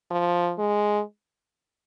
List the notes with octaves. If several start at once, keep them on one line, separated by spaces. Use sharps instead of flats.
F3
G#3